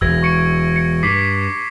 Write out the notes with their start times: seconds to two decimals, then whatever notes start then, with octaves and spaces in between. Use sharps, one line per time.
0.01 E1 E2 E6 G#6 A#6
0.23 C#6 C#7 D7
0.76 C#7
1.03 G2 D6 B6 C7